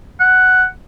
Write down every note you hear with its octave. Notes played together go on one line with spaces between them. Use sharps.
F#5